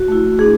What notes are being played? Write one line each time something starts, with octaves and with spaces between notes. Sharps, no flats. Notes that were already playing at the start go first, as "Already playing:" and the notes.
Already playing: F#4
A3 E4
A3 D4 G#4